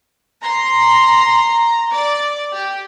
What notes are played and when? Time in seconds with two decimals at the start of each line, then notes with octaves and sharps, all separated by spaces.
0.43 A#5 C6
1.92 D5
2.53 G4